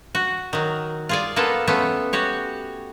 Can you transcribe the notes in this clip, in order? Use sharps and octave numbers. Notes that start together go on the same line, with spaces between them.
F#4
D#3 F#3
F4 G#4 D5
A#3 B3 F4 A4
A3 B3 C#4 F4
F#4 G4 C#5